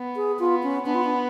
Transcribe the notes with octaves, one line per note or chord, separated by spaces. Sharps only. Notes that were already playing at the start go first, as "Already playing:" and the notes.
Already playing: B3
G#4
B3 F4
C#4
B3 D4
F4
D4